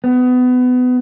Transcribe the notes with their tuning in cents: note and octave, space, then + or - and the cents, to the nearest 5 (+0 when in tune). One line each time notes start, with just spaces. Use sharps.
B3 +25